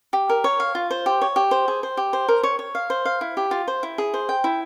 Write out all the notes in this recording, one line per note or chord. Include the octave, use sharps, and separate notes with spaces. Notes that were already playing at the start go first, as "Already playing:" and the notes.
G4
A#4
C#5
F5
F4
C5
G4
C#5
G4
C5
G#4
C5
G4
C5
A#4
C#5
C#5
F5
C5
F5
E4
G4
F4
C5
E4
G#4
C5
G5
E4